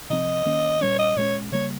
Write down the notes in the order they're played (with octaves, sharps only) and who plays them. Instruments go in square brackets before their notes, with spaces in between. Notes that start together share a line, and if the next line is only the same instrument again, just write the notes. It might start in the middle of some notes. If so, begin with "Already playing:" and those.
[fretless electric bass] C3 F3 C4 [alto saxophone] D#5
[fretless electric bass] D#3 A#3 C#4
[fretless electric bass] A#2 G3 C#4 [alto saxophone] C#5
[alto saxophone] D#5
[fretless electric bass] A#2 G#3 C#4 [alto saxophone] C#5
[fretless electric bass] C#3 G3 A#3 [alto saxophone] C#5